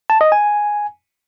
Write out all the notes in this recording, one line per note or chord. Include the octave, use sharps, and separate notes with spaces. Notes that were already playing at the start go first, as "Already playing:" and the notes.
A5
D#5
G#5